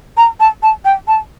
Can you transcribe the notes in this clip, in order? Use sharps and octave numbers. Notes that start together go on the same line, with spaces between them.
A#5
A5
A5
G5
A5